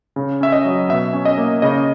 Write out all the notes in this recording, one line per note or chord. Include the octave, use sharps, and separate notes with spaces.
C#3
C#4 E5
D#5
F#3
B2 E5
C#4
D#5
A#3
C#3 D#5